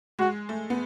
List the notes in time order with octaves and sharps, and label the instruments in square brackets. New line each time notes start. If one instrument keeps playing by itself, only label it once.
[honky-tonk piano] G#3 [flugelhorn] F#4
[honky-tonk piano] A3
B3